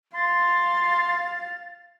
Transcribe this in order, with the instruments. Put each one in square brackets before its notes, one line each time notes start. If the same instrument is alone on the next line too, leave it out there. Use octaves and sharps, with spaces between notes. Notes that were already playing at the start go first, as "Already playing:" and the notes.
[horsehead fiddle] F5 [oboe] C6 [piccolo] A6